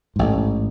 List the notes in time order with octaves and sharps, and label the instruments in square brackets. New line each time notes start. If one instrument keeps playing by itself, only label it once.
[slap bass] A1 G#2